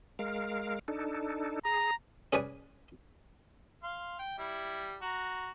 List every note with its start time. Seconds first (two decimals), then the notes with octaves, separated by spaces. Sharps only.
0.19 G#3 A#4 F5
0.88 D4 D#4 A4
1.65 G#4 A#5
2.33 C#4 G#4 B4 C#5 D5 G#5
3.83 F5 C6
4.19 G5
4.38 G3 E4
5.02 F#4 A#5